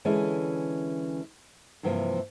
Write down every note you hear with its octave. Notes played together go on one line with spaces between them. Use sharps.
D3 E3 G#3 C#4 E5
G2 C3 E3 F3 G3 A#3